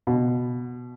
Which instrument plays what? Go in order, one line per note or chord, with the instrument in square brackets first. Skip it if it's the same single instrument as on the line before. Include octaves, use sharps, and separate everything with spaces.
[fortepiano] B2